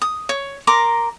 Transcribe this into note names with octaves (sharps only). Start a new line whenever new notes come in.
D#6
C#5
A#4 A#5 C6 D6